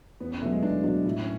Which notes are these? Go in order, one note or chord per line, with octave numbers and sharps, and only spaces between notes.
E2 B3
C#4
B2 F#3 A3
G#3
E2 D4
B2 F#3 D4
A2 E4
C#4